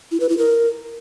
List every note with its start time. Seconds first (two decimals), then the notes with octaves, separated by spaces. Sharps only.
0.11 E4
0.20 B4
0.29 E4
0.38 A#4